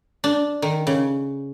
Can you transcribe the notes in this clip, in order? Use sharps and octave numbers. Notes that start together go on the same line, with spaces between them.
D4
D#3
C#3